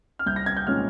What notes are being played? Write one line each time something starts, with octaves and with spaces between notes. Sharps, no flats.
F6
C2 G6
A#6
G#6
G6
A#2 G#3 C#4 F6